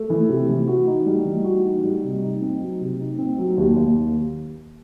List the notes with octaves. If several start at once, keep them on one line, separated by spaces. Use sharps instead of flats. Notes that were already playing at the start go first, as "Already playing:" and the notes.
Already playing: A3
E3
C3
E3
F#4
D#4
G3
E3
F#4
D#4
G3
C3
D#4
C4
F#3
C3
D#4
C4
F#3
D#2
D#2